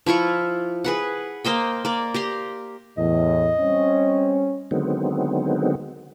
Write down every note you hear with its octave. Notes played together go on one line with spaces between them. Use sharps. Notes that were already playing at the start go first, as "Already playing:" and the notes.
F3 E4 F4 C#6
G#4 B4 F#5
A#3 C5 D#5 G5
A#3 D5
G4 A#5 C6
E2 A2 D#5
G3 C4 C#4
D3 D#3 F#3 G#3 B3 C4